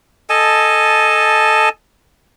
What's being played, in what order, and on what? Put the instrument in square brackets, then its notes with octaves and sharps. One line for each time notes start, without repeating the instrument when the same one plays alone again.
[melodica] A4 D#5 G#5 A5